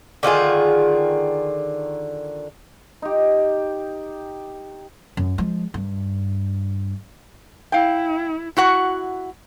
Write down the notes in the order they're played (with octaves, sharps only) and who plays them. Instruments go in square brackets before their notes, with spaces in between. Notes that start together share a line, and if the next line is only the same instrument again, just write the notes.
[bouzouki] D3 D#3 F4 G#4
[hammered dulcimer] D#4 G4
[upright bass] F#2
F3 G#3
G2
[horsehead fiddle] E4 [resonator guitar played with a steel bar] F5 G5
[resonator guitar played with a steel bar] E4 F#4 F#5